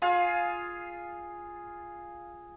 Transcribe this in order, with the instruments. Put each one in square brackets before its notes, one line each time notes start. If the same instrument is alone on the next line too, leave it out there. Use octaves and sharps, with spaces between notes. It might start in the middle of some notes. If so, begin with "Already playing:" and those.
[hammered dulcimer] F4 G#4 F5